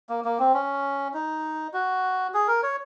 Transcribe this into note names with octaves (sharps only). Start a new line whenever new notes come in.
A#3
A#3
C4
C#4
D#4
F#4
G#4
A#4
C#5